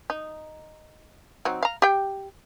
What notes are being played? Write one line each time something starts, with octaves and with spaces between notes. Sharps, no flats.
D#4
F#3 C4 D#4
F5 A#5
G4 G5